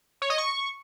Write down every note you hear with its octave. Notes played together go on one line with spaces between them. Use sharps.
C#5
D#5
C#6